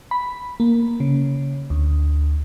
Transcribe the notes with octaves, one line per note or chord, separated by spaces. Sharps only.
B5
A#3
C#3
D2